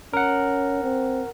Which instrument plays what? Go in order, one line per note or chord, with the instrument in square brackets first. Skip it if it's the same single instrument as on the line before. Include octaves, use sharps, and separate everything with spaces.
[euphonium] C#4 [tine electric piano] A#4 F#5
[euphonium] C4